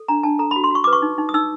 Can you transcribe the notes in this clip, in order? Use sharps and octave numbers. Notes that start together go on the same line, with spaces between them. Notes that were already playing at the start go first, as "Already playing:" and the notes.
Already playing: A4
D4 A#5
D4 A5
A4 A#5
B5
F#4
C6
F#4 C#6
B4 D6
C#6
D#4
D#4
D#6
D#4 E6